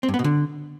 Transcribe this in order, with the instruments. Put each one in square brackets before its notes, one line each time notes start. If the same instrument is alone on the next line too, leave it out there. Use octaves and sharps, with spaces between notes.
[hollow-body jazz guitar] C4
G2
B3
B2
D3